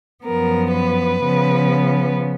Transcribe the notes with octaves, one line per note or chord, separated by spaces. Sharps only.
F#2 F3 B3 A#4
B4
C#3 F3 B3